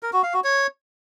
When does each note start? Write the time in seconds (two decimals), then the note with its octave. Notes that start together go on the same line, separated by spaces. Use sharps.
0.03 A#4
0.13 F#4
0.23 F5
0.34 F#4
0.44 C#5